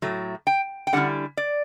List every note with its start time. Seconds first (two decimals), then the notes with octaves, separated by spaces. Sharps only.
0.02 A2 F#3 A3
0.47 G5
0.87 G5
0.93 D3 G3 C#4 E4 F#5
1.37 D5